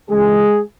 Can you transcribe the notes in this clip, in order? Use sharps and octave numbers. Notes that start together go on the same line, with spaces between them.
C#2 C#3 E3 G#3 G#4